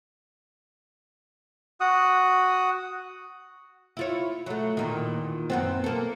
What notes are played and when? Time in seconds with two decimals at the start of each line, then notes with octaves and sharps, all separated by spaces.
1.80 F#4 F#5 D#6
3.97 E4 F4 C#5
4.46 F#3 A3
4.77 E2 A#2 D#3
5.50 F#2 B3 C4
5.84 A#3 A4